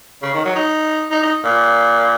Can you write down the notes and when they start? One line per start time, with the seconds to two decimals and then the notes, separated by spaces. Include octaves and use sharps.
0.22 C#3
0.34 D#3
0.45 F#3
0.55 D#4
1.10 D#4
1.22 D#4
1.44 A#2